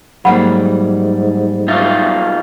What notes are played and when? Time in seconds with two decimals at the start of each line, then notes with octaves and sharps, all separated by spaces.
0.25 G#2 F#3 G3 A#3 F#5 B5
1.68 B1 D#4 F4